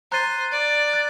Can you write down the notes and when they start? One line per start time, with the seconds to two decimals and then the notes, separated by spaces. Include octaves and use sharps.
0.12 C5 A#5 F#6 A6 D#7
0.52 D5
0.93 F#6 A6